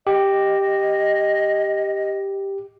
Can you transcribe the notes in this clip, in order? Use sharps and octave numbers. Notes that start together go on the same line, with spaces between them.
G4 D#5